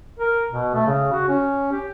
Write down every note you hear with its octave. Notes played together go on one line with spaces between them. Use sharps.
A#4
B2
A3
C#3
F#4
C#4
G4